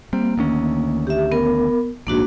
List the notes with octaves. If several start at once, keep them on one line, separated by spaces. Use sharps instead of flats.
G3 A#3 C4
D2 D#3 C#4
G4 E5
B3 A#4
A#1 G#2 A#3 D4 F#4